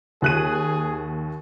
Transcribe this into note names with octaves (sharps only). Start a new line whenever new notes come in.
D#2 G#4 F#6 D#7